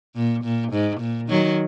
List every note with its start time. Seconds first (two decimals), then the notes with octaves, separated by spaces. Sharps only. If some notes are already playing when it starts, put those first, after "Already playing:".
0.16 A#2
0.44 A#2
0.73 G#2
1.01 A#2
1.29 D#3 F#3